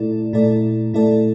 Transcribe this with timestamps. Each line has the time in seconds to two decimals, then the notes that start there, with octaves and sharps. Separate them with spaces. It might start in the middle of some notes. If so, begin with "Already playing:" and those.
Already playing: A#2 A3 E4 A4 D5
0.33 A#2 A3 E4 A4 D5
0.93 A#2 A3 E4 A4 D5